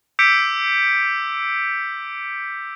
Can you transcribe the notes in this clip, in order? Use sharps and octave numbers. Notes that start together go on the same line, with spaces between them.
D6 E6 G6 B6 C#7 D7